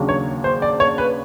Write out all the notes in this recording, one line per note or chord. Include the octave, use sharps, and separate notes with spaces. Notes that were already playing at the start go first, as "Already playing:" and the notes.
Already playing: D#2 C#3 F#3 A#3 D4
C#5
C5
D5
C#5
B4